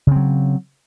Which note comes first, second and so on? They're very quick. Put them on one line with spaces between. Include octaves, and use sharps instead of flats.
C#3 C4 F#3